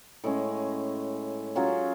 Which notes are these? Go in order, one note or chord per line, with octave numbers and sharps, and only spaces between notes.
A2 G#3 C#4
F#3 C#4 F4 G#4